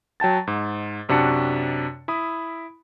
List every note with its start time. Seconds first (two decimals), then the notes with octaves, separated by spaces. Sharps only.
0.20 F#3 G5 A5 A6
0.47 G#2
1.09 F#2 C3 D4 F#4 A5 C#7
2.08 E4 B5 D#6